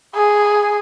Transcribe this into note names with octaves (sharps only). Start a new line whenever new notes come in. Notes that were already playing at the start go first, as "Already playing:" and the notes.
G#4